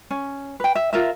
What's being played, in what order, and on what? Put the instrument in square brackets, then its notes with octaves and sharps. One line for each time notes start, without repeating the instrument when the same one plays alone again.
[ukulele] C#4
B4 G5
E5
F4 A#4 E5